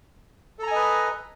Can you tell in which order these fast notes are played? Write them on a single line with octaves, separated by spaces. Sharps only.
A4 A#5 G#5 D#5 B4